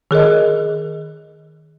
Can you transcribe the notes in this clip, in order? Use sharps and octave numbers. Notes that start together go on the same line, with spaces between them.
D#3 G#4 A#4 D#5